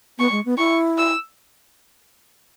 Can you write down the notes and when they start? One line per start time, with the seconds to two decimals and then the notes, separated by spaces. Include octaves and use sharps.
0.18 B3 C#6
0.32 G#3
0.46 B3
0.58 E4 C#6
0.98 E6